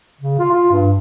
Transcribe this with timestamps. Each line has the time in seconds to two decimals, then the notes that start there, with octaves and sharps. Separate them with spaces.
0.21 C#3
0.39 F4
0.52 F4
0.71 G2